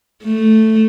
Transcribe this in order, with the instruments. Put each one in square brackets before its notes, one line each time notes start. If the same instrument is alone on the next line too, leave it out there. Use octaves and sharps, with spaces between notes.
[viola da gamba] A3